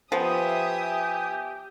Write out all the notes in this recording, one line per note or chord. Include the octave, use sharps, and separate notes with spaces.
F3 B3 G4 E5 G#5 D#6